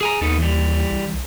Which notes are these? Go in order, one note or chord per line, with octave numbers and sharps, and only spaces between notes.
G#4 G#5 A#5
D#2 B3 D#4 A4
E3 G3
C2